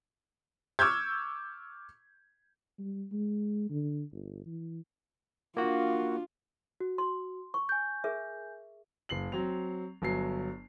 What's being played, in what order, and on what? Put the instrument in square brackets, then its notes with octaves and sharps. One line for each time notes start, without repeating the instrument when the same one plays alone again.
[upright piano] C#6 D6 E6 F6 G6 G#6
[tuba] G3
G#3
D3
G1
E3
[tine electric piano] A#3 F#4 [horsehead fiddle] D4 F4
[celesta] F#4
[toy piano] C6
C#6
[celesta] G#5 G6
[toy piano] G#4 A#4 E5
[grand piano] F#1 C7 F#7
F#3 C4 F7
G1 F#3 C7